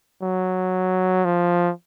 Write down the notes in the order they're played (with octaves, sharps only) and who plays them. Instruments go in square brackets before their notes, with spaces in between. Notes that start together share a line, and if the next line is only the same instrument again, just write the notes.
[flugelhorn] F#3
F3